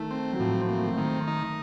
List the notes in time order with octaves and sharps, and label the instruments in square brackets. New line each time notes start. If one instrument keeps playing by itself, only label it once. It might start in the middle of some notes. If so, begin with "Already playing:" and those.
Already playing: [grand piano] D#3 [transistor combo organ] A3
[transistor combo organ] C4
[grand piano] F#3
[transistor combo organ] A2 [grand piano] F3
[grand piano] A#3 [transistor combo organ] C4
[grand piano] A3
F#3
[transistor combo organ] D#3 [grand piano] A3
[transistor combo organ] D#4